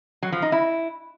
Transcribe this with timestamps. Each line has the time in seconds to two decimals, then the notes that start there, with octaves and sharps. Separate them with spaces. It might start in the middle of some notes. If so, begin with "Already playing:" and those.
0.23 F#3
0.32 F3
0.42 D#4
0.52 E4